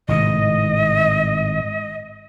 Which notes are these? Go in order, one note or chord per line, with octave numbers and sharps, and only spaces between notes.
G#1 A2 C3 D#5